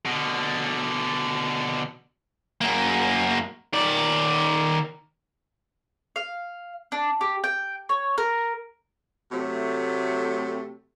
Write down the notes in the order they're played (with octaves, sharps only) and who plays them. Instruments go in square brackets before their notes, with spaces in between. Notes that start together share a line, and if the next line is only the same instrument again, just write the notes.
[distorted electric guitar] B2 D3
F#2 A#3
D#3 D5
[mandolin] F5
D4
G4
G5
C#5
A#4
[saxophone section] C3 F#3 A3